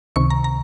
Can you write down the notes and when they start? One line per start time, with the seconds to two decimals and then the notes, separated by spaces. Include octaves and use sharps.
0.16 C#2 C3 D#3 C#6
0.30 A#5
0.44 A#5